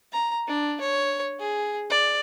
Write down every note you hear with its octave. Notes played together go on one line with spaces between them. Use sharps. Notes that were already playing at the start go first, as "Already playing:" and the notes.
A#5
D4
C#5
G#4
D5